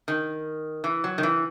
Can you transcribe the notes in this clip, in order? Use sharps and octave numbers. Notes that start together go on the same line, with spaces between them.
D#3
E3
F#3
D#3
E3